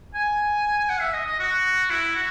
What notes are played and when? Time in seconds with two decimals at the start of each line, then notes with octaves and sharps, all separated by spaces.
0.15 G#5
0.89 F#5
1.01 E5
1.14 D#5
1.26 D#5
1.40 F#4
1.90 E4
2.15 F#4